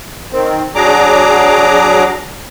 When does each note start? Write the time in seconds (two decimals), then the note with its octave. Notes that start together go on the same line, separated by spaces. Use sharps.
0.32 D#3 C4
0.75 F#3 D4 G#4 A#5 D6